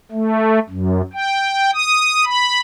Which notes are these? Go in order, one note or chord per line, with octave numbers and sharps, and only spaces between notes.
A3
F#2
G5
D#6
B5